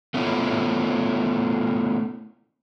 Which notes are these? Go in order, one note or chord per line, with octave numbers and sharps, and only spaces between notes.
A3 B3 C#4 E4 F4